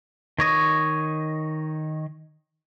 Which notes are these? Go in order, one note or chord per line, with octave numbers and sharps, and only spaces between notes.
D#3 C#5 D#5 C#6